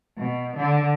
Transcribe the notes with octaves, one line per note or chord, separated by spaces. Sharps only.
B2
D3